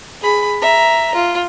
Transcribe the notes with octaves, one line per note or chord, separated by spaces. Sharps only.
G#4 B5
E5 A#5
F4